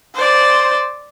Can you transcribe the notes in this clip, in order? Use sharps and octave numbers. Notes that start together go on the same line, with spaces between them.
C5 D5